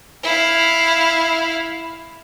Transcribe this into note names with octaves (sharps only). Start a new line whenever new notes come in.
E4 F5